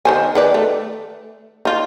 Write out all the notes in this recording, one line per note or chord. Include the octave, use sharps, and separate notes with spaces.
D#3 C5 G#5
D#3 B4 D5
A3
D#4 F4